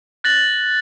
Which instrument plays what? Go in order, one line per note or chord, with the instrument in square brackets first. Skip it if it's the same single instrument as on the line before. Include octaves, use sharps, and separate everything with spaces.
[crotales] F#6 A6 A#6 F#7